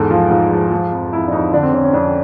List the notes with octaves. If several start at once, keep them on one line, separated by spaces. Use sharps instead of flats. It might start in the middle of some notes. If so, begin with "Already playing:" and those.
Already playing: E2 G#2 A4
F3 F4
G#2 F4
F3
F3
F2
F2 E4
D4
F2 D#4
D3 D4
C4
D3 C#4
C#4
F2 D4